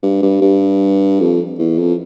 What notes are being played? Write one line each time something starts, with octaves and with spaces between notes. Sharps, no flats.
G2
G2
G2
F2
E2
F2